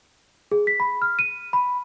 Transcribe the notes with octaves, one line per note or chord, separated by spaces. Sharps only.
G#4
B6
B5
F6
D#7
B5